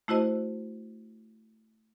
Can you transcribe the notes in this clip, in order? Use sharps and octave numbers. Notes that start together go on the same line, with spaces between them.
A3 E4 F#4 C5 D#5